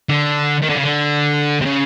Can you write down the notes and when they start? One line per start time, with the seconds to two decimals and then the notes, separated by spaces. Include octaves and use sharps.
0.09 D3
0.62 D#3
0.69 D3
0.75 C#3
0.83 D3
1.61 C3
1.65 C#3